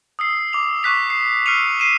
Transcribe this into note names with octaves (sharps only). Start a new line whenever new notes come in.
D#6 E6 C7
D6 F7
C#6 D6 F#6 B6 F7
C7
E6 F6 C7 C#7 D#7 F7
C7 D#7 E7